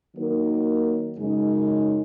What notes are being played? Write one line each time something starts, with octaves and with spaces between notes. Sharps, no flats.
D#3 F#3 A#3 D#4 A#4
F#2 C#3 G#3 D#4